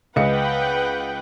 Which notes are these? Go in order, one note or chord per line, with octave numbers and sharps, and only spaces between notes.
C#2 B4 D#5 F#5 G5 C#7